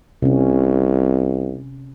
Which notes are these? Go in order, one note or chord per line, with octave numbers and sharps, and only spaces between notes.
C2 C3 C#4